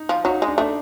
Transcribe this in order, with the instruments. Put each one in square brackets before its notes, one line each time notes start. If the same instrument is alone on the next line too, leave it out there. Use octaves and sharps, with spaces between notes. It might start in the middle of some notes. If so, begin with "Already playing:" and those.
Already playing: [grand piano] D#4
[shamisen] F3
[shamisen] F#3 [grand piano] D#4
[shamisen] G#3
[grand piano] D4
[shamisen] A3 [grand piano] D4